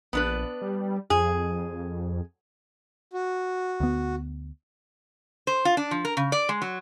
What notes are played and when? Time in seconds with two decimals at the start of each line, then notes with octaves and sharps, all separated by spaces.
0.13 A#1 B3 D4 B4
0.61 G3
1.10 F2 G#4
3.13 F#4
3.80 D2 B3
5.47 C5
5.65 F4
5.77 D4
5.91 F3
6.05 A#4
6.17 C#3
6.32 D5
6.49 G#3
6.62 F#3